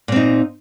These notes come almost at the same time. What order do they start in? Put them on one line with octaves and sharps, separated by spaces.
A#2 C4 D#4